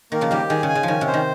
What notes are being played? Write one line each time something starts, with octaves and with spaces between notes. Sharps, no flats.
D#3 A#3
C#3 F3
D#3 G3 G4
D#3 G#4
C#3
G#5
C#3
D#3 F3 C#4
C3
C5
D#3